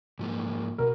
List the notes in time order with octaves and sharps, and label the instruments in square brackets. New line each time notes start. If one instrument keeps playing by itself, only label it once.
[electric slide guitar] G#2 F3 A#3
[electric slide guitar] B2 [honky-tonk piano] A#4